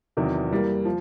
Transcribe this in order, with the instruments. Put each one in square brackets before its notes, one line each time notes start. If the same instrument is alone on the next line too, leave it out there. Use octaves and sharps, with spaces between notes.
[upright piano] E2 C3 D#3 F#3
E3 G3 A#3
F3